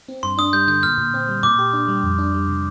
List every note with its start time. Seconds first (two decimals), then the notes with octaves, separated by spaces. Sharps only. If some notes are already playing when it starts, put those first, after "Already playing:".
0.08 C4
0.23 G2 C6
0.38 D4 D#6
0.53 G3 G6
0.68 D3 G6
0.83 A#2 F6
0.98 A#2
1.14 C4
1.28 G3
1.43 A#2 D6
1.59 G4
1.73 D4
1.88 G3
2.03 F2
2.18 D4
2.34 G3
2.48 C3